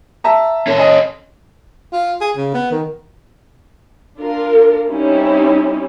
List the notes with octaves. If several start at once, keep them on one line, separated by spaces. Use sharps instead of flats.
E5 A5 A#5
C#4 A4
D#5 G#5
F4
G#4
C#3
B3
D#3
D4 F4 A#4
G3 C4 C#4 D#4 E4